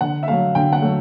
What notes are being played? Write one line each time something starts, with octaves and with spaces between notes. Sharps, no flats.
D3 F#5
E5
F#3 A3 F5
D3 G5
F#5
F#3 A3